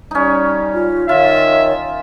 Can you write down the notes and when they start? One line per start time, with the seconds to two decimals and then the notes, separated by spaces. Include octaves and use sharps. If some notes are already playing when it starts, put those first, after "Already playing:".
0.11 G3 C#4 D#4
0.74 F4
1.09 D#3 F4 C#5 E5